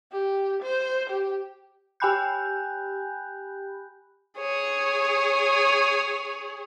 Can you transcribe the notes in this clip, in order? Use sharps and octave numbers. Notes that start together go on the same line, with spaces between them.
G4
C5
G4
G4 G5 G#5 B5 F#6 G6
G#4 C#5